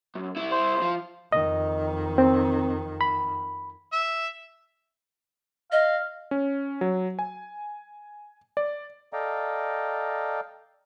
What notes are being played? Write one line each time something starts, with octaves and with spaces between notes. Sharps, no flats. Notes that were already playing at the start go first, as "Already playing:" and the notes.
F#2
C2 E4
C5
F3
F2 D#3 D#5
C4
B5
E5
D#5 F5
C#4
F#3
G#5
D5
A4 D5 D#5 F5 G5 A#5